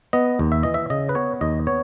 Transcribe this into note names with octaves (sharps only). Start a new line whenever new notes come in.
B3 D#5
D#2
E5
E3 D#5
E5
C#3 D#5
B4
B3 C#5
D#2 D#5
B3 C#5